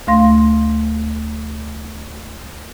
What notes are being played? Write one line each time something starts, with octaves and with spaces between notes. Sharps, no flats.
D2 A3 F5 C6 A#6